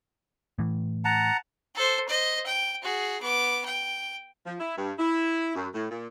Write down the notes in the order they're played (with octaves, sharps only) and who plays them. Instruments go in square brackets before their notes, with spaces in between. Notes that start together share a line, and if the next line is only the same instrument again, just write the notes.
[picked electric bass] A2 E3
[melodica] F#5 A5 A#5
[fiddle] A4 C5
C5 D#5
G5
F#4 G#4
B3 D6
G5
[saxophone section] F3
E4
G2
E4
F#2
A2
A#2